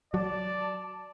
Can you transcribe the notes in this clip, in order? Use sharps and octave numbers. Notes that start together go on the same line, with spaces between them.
F#3 D5 A5